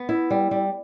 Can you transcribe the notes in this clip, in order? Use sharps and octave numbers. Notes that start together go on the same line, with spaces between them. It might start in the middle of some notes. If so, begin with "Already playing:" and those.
Already playing: B3
E4
G3
G3